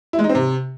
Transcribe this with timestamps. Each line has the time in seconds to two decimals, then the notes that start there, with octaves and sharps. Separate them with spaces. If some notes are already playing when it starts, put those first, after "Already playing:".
0.13 E4
0.19 G#3
0.24 D#4
0.29 C4
0.35 C3